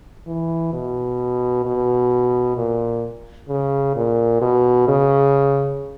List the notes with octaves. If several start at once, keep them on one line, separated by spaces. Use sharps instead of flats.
E3
B2
B2
A#2
C#3
A#2
B2
C#3